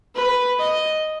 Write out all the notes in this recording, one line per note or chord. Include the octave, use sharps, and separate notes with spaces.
B4
D#5